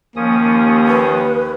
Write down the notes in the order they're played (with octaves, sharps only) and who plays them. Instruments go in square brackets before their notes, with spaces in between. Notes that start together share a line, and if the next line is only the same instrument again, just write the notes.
[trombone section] D#2 [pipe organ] F3 C#4 D#6 [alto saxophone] A#3
[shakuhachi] B4